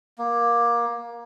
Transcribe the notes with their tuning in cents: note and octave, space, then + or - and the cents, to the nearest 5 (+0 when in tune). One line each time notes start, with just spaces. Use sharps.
A#3 +20